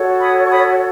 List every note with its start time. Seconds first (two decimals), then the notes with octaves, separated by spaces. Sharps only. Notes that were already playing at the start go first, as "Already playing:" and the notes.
Already playing: F#4 A4 C#5
0.20 B5 D#6
0.45 C#6
0.50 B5 D#6